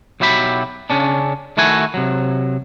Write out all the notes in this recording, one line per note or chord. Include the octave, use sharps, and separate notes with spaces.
B1 F#3 E4 G4 B5
C#3 C#4 D4
D#3 A3 E4 F#4 G#5
C3 F#3